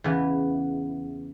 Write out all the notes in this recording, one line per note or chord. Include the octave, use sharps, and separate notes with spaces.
E2 C#3 E3 B3